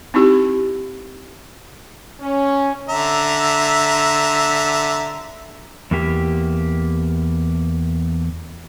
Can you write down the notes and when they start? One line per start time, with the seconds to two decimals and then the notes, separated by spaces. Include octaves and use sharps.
0.14 C4 D#4 E4 G4
2.20 C#4
2.89 D3 E5 A#5
5.91 E2 A#3 G4